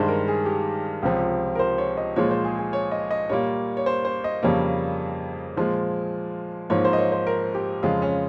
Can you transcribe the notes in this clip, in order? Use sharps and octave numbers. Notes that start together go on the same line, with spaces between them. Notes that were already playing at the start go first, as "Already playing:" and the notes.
Already playing: G2 D#3 G#3 C5
A#4
G#4
G4
C#2 C3 F3
A#4
C5
C#5
D#5
A#2 F3 G#3 C#5
C5
G#4
G#4
C#5
D#5
D#5
A#2 G3 A#3 C#5
C#5
C5
C5
D#5
F2 C#3 G3 A#3 C#5
A#2 F3 G#3
G#2 F3 A#3 C#5
C5
D#5
C#5
C5
A#4
G4
F2 C#3 G#3 F4
C#4